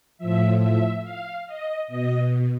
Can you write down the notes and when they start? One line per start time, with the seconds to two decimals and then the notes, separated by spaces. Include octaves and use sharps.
0.18 A2 F3 E5
0.60 E5
1.03 F5
1.46 D#5
1.88 B2 D#5